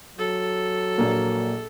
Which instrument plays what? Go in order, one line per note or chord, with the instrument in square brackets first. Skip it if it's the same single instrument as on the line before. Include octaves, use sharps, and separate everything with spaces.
[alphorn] F#3 [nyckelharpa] A4
[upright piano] A#1 A#2 A#3